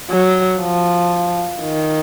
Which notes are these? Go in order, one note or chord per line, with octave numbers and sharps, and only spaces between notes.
F#3
F3
D#3